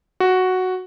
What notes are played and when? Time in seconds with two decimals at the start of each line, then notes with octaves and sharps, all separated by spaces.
0.20 F#4